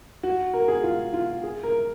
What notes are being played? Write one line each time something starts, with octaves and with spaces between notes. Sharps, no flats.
F#4
A#4
G#4
F4
F4
G#4
A#4